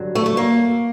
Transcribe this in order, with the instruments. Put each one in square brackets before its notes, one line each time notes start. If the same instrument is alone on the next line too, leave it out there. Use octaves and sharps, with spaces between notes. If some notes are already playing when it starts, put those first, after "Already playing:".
Already playing: [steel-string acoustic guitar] G2 D3 F#3
A3
A3
A#3